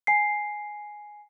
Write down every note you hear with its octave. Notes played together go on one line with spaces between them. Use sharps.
G#5 C7